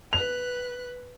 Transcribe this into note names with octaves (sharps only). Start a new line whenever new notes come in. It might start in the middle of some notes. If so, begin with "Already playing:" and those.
B4 F#6 F7